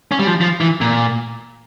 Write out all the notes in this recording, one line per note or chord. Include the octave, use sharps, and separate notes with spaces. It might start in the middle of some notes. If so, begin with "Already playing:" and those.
C#4
G3
F3
F3
E3
A#2